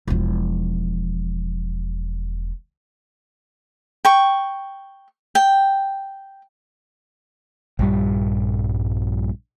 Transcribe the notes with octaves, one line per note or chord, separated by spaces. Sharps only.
E1 F3
G5 C#6
G5
A#1 G2 G3